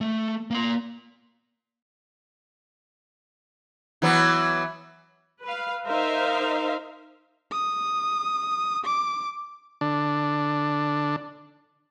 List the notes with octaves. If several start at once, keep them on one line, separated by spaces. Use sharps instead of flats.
A3
A#3 C6
E3 F#3 B3
B4 F5
D#4 A#4 C5 E5 F5
D#6
D6
D3 D4